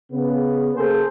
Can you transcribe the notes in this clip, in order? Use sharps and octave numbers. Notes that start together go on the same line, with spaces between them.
C#3 B3
C#3 A#3 G#4 A4 C5